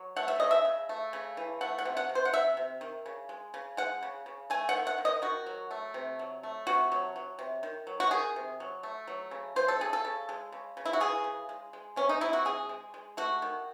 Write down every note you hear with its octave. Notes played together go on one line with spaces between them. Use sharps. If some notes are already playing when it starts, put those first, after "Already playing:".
Already playing: F#3
A3 F#5
E5
C#3 D#5
E5
C#3
A3
C#3
E3
A3 F#5
F#5
C3
F#5
C3
C5
F#5
C3 E5
C3
D#3
C#3
G#3
C#3
G#3 F#5
C#3
C#3
A3 G#5
F#5
D#3
F#5
D#3
D#5
D#3 F#4
F#3
A3
C3
F#3
A3
C3 F#4
F#3
F#3
C3
D#3
F#3
F#4
D#3 G#4
C3
F#3
A3
F#3
C#3
F#3 C5
A4
C#3 G#4
A4
C#3
G#3
C#3
C#3
E4
F#4
E3 G#4
C#3
G#3
G#3
C3 C#4
D#4
C3 E4
F#4
G#3 G#4
G#3
G#3
A3 F#4
D#3